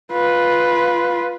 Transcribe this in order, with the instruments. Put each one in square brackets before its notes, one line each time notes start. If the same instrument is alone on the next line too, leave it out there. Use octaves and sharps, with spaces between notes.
[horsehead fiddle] F4 B4